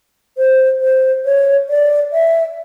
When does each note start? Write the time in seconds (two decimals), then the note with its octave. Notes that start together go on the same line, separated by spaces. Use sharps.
0.37 C5
0.81 C5
1.25 C#5
1.69 D5
2.13 E5